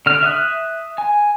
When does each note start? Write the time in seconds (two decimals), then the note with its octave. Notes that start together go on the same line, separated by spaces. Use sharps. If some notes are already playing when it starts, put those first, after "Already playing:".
0.06 D3 F6
0.23 E5 D#6 F#6
0.98 G#5